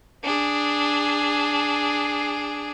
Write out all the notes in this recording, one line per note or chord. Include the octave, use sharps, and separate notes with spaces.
D4 G#4